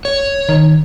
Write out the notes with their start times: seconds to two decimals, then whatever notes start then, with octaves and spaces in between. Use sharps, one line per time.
0.05 C#5
0.49 D#3